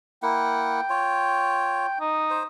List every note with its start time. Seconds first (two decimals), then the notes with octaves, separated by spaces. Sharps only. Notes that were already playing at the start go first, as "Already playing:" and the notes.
0.23 A#3 E4 F#5 G5
0.90 F4 C#5
2.00 D#4
2.30 C5